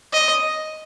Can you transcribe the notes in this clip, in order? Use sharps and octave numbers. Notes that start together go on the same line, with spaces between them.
D#5